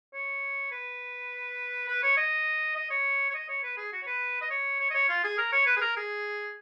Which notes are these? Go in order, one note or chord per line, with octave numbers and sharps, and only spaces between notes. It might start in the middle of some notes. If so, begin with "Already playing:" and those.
C#5
B4
B4
C#5
D#5
D#5
C#5
C#5
D#5
C#5
B4
G#4
F#4
C#5
B4
D#5
C#5
C#5
D#5
C#5
F4
G#4
A#4
C#5
B4
G#4
A#4
G#4